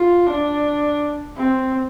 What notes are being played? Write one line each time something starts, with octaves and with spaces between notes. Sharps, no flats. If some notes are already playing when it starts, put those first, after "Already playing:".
Already playing: F4
D4
C4